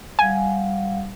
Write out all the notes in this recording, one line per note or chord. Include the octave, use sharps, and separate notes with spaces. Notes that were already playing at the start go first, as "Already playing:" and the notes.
G3 F5 F#5 G#5